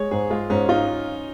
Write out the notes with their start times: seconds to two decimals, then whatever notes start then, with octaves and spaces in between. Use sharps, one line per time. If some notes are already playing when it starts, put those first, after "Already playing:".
Already playing: G#3 C#5
0.11 G#2 G#4
0.30 G#3 F4
0.50 G#2 C#4
0.69 D#4 F4